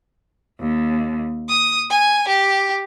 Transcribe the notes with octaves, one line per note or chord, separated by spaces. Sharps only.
D#2
D#6
G#5
G4